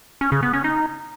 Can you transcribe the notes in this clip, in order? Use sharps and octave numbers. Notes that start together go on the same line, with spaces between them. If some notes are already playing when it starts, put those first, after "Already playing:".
C#4
C#3
B3
C#4
D#4